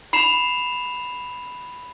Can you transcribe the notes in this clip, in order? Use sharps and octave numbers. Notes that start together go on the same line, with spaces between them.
B5 C7 E7 F7